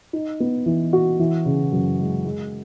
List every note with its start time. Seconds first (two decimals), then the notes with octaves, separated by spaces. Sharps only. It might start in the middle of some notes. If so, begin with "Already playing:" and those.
0.13 D#4
0.40 B3
0.66 E3
0.93 F#4
1.19 E3
1.45 C#3
1.72 F#2
1.99 G#3
2.25 G#3